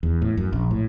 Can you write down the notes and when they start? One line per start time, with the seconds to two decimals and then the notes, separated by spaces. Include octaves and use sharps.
0.03 E2
0.22 A2
0.37 F#2
0.53 A#1
0.71 A2